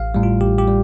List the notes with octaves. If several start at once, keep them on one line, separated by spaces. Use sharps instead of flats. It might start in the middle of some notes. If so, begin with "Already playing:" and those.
Already playing: A1 F5
A2 G3
F4
A1 G4
G4
G3